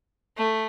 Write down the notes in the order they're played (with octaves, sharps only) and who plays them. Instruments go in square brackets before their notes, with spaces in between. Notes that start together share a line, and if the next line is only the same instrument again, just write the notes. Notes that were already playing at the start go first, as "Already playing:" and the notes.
[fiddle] A3